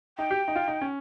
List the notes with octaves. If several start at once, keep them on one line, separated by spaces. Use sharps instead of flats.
D#4 G5
G4
D#4
F4
D#4
C#4